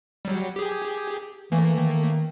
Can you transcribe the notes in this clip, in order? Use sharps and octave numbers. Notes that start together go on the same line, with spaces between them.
F#3 G3
G4 G#4
E3 A3 A#3
D#3